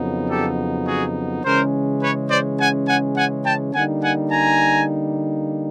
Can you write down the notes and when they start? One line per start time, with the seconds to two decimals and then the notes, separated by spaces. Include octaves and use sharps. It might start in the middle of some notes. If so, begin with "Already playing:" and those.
Already playing: F2 C#3 F#3 B3 D#4
0.29 G4 A4
0.87 F#4 G#4
1.44 C#3 E3 G#3 C#4 A#4 C5
2.02 B4 C#5
2.30 C5 D5
2.60 F#5 G#5
2.88 F#5 G#5
3.16 F#5 G#5
3.46 G5 A5
3.74 D3 G3 A#3 D#4 F#5 G#5
4.03 F#5 G#5
4.31 G#5 A#5